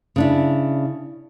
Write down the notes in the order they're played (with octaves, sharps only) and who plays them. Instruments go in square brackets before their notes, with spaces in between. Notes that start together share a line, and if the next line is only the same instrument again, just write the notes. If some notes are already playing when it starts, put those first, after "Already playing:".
[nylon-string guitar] C#3 D4 E4